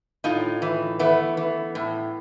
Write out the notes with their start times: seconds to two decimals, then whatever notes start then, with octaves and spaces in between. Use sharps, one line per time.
0.24 A2 D#4 F4
0.62 E3
0.99 E3 A3 B3
1.37 E3
1.75 A2